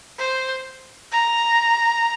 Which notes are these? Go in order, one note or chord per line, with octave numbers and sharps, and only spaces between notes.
C5
A#5